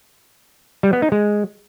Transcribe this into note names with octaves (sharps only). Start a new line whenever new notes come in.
G3
B3
D#4
G#3